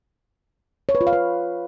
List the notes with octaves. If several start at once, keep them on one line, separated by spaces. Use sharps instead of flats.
C#5
B4
F4
F5
B4